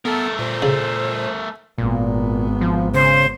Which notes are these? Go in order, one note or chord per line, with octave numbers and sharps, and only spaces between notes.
A3 B3 A4 A#4
A#2 C5
C#3
G#1 A#2 B3
F3
C#3 C5